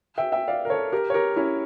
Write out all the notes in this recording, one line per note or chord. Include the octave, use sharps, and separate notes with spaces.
E5 G5
E5 G5
D5 F5
A#4
A4 C#5
G4 A#4
C#5
G4 A#4
C#4 E4